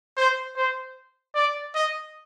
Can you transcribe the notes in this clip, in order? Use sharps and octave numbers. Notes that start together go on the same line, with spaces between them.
C5
C5
D5
D#5